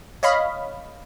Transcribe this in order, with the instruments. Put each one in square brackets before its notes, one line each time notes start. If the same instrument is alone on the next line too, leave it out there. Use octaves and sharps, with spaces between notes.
[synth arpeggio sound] C#5 D#5 F5 B5